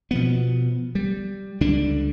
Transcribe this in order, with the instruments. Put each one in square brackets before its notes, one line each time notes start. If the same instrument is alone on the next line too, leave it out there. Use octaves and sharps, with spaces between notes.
[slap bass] B2 F3 B3
G3
C#2 D3 G3 D4